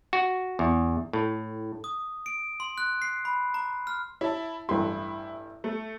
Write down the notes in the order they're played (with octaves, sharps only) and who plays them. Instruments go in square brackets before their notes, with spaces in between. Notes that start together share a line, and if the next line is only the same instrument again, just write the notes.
[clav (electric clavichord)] F#4
E2
A2
[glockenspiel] D#6
D7
C6
F#6
C7
B5
A#5
F6
[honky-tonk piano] E4 A5 [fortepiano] C#5
[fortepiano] A1 G2 C6 [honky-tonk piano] E4
[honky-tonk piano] A3